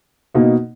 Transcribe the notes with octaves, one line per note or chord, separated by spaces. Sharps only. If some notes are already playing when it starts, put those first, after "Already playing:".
B2 A#3 D#4